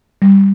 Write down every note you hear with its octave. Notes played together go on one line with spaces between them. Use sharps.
G3